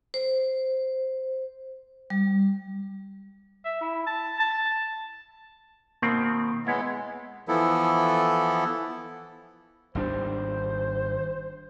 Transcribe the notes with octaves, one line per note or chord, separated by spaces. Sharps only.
C5
G3
E5
E4
A5
A5
B2 D#3 A#3 C4
G#3 B3 E4 C#5
E3 F3 B3 E4 A4
G#1 G3 D4 C5